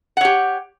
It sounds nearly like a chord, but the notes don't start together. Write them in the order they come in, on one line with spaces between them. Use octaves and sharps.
F#5 C#5 G4